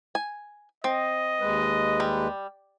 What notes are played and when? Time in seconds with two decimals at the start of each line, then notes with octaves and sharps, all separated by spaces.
0.15 G#5
0.84 C4 D#5
1.40 D#2 G#3 B4
2.00 G3